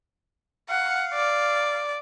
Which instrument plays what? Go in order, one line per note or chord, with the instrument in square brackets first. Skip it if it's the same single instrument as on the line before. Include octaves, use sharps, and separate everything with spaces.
[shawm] F5 [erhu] F#5
[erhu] D5